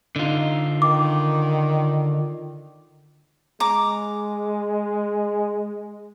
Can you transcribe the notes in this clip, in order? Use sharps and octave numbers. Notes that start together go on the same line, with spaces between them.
D3 D#4 F4
D#3 D6
G#3 A#5 D6